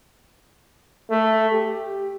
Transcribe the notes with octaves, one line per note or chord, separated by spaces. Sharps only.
A3
G4